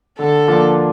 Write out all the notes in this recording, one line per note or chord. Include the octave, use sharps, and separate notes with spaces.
D3 A4
F3 A#3 D4 F4